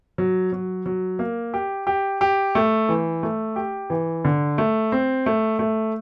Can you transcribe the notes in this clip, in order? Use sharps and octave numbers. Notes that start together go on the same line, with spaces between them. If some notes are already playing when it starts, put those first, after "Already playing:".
F#3
F#3
F#3
A#3
G4
G4
G4
A3
E3
A3
G4
E3
D3
A3
C4
A3
A3